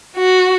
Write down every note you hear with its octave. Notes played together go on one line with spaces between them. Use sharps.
F#4